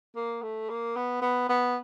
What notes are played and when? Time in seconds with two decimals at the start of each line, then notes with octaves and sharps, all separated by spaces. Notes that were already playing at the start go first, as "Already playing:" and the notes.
0.16 A#3
0.42 A3
0.70 A#3
0.96 B3
1.22 B3
1.49 B3